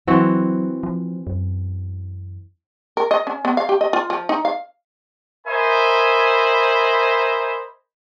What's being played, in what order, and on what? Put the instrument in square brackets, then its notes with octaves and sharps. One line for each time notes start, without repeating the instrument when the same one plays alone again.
[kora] E3 C4 F#4 [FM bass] F#3
[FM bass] F3
F#2
[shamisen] A#4
D#5
C#4
B3
F5
G4
D#5
F4
F3
D#4
F5
[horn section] A#4 C5 D#5 E5 G#5 B5